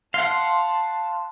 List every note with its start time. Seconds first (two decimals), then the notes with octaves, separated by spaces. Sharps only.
0.14 F5 F#5 A5 C6